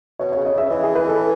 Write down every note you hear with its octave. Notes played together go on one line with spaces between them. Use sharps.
B2 C#5
C#5
C#3
D#5
C#3 E5
E3 D#5
G#4
B4
A4